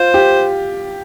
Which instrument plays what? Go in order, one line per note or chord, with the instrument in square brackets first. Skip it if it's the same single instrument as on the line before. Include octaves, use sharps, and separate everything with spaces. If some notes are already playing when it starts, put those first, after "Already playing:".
Already playing: [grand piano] F4 [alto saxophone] C5
[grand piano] G4